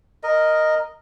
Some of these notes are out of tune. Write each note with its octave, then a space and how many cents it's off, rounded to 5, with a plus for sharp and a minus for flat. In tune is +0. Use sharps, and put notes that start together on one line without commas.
A#4 +0 D#5 -5